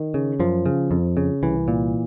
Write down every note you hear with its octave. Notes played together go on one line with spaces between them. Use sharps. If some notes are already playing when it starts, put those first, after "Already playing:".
Already playing: D#3
C#3
F#2 F3
C#3
F2
C#3
C2 E3
A#2